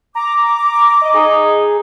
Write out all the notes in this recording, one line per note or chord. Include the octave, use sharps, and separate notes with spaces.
A#5 D6
D#5
D#4 G#4